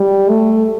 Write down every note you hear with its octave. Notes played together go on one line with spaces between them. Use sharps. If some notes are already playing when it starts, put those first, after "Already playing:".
Already playing: G3
A3